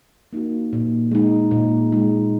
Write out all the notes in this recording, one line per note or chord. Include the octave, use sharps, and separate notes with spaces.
A#3 D#4 F#4
A#2
G#3 D#4
A#2
G#3 D#4